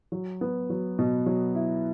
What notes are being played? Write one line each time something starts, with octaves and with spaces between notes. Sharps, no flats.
F#3
B3
F#3
B2
F#3
E4